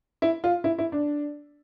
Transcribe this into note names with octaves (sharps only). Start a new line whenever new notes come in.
E4
F4
E4
E4
D4